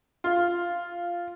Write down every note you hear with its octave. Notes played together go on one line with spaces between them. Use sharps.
F4